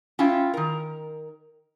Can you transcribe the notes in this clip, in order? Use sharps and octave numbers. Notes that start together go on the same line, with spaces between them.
C#4 E4 F4 G5
D#3 A#4